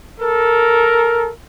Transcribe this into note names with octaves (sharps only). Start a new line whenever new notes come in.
A4 A#4